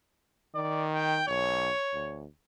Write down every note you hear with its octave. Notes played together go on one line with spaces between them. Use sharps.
D#3 D5
G5
B1 C#5
D2